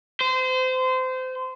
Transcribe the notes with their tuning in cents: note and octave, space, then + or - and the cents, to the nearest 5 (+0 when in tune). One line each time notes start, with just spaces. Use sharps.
C5 -25